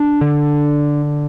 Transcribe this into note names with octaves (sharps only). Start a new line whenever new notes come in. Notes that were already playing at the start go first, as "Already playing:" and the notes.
Already playing: D4
D3